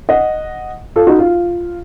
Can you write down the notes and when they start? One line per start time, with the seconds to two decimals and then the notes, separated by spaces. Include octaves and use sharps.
0.09 D#5 F#5
0.96 F4 A4
1.07 D#4 F#4
1.19 F4